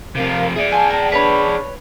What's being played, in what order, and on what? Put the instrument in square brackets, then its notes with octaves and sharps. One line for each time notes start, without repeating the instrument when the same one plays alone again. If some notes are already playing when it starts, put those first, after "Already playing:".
[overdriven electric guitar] C3 F3 [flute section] A#4 F5
[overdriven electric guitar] G#4 D5 [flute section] E5
[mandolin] F4 G#5 [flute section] A5
[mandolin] A#4 [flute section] G5 A5
[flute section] D4 A5 [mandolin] B4 C#5 B5